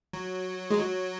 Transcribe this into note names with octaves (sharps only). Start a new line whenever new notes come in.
F#3
G#3
F#3